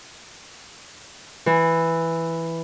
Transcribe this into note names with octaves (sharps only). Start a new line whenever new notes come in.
E3